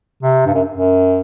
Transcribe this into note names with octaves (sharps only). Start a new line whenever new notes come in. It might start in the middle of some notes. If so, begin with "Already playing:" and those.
C3
G2
F#2
F#2